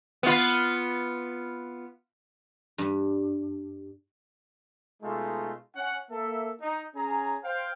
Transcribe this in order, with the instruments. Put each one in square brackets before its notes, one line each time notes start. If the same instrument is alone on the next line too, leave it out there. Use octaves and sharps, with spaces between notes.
[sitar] B3 F4
[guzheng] G2
[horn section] B2 G#3 A3 D#4 F4 A4
C#4 F#5
A#3 A4 E5
D#4
C#4 G#4 A#5
C5 F5 G5